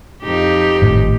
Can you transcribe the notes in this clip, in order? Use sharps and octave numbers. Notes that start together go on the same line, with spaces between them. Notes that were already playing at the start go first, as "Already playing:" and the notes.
F2 D#4 G4
G#1 A2 A3